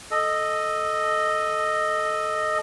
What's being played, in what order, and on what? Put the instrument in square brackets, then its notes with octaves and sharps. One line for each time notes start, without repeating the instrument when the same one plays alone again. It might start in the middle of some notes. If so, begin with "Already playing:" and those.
[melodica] A4 D#5